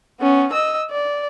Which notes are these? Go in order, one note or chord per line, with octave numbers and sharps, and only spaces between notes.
B3 C#4
D#5 E6
D5